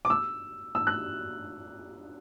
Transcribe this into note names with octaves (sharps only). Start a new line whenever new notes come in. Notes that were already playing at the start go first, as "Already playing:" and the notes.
D6
E6
E6
F#6